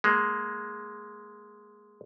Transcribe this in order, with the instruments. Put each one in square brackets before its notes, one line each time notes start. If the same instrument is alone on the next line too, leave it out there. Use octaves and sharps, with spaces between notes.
[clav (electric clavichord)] G#3 A#3